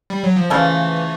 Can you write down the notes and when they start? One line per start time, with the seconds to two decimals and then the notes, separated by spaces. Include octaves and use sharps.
0.10 G3
0.23 F#3
0.36 F3
0.50 C#3 E3 F3 A3